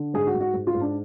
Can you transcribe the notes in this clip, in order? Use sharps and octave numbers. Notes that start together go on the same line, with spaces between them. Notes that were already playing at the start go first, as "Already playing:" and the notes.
Already playing: D3
G#2 G#4
F#4
G#2
F#4
G#2
F4
G#2
D4